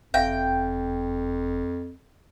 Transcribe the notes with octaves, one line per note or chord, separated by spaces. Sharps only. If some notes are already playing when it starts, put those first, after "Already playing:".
F#1 F2 E5 F5 G5